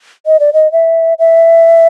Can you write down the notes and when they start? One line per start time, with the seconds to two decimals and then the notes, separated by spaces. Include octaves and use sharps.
0.26 D#5
0.40 D5
0.53 D#5
0.72 E5
1.19 E5